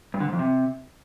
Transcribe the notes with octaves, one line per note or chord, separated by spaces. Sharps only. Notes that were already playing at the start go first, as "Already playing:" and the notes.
G2
D3
G#2
F2
C3